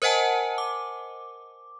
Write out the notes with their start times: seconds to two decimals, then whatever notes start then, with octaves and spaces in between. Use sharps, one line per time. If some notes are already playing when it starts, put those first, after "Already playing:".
0.02 A#4 C5 D#5 F#5 G#5 A5
0.58 D6